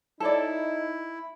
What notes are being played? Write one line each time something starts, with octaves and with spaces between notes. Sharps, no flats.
D#4 E4 A4 C#5 D5